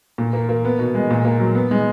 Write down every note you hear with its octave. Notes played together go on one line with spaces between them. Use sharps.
A#2
A#3
A#3
B3
B2
G#3
A#2
A#3
F#3
B3
G#3